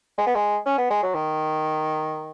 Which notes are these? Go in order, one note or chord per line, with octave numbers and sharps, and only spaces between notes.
G#3
B3
G#3
C#4
B3
G#3
F#3
D#3